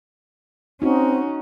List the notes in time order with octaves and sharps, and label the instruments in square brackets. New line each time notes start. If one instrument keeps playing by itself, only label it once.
[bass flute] C4 [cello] C#4 [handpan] D#4 F#4